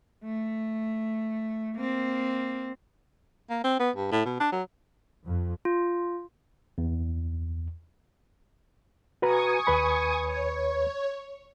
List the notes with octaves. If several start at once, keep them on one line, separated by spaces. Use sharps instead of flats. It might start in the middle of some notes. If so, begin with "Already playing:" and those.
A3
A#3 C4
A#3
C4
B3
G2
A2
B2
D4
F#3
F2
F4
E2
F#4 B4 G#5 A#5 C#6 D#6
D#2 B4 B5
C#5